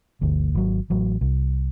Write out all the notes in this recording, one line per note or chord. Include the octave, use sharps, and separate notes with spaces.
G1 D2
G#1 F#3
A1 F#3
C2